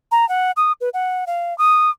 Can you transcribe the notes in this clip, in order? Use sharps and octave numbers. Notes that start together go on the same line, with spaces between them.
A#5
F#5
D#6
B4
F#5
F5
D#6